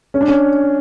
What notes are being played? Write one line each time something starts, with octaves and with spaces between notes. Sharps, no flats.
C#4
D4
C#4